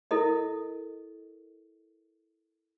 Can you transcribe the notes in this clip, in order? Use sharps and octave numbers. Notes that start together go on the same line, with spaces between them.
E4 A4 A#4 D#5